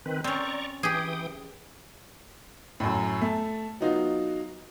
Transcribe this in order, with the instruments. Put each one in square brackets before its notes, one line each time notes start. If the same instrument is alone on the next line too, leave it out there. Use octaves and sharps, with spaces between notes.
[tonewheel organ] D#3 C4 B4
[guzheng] C4 C#4 [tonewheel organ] D5 A#5 C#6
[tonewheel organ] E3 G5 D#6 [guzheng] G4 G#4
[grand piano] F#2 A2
A3 A5
F#3 B3 D#4 F4 F#4